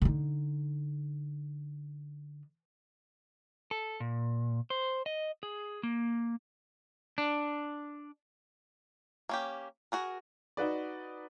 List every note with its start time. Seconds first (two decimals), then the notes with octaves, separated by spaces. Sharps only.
0.02 D3 D#4
3.71 A4
4.00 A#2
4.70 C5
5.06 D#5
5.43 G#4
5.83 A#3
7.18 D4
9.29 A#3 C#4 G4
9.92 F#4 G#4 A#4
10.57 D#4 F#4 B4 D5